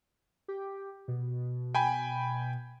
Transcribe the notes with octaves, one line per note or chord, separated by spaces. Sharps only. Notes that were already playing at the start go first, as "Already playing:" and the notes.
G4
B2
G5 G#5 B5